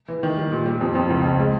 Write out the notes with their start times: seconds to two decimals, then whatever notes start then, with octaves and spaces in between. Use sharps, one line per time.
0.08 E3
0.23 D#3
0.37 G3
0.52 A#2
0.66 G3
0.81 F2
0.95 F2
1.10 C#2
1.25 C#2
1.39 G#3